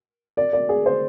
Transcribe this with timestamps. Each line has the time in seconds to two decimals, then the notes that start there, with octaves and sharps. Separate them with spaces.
0.37 D5
0.53 D5
0.69 G#4
0.86 C5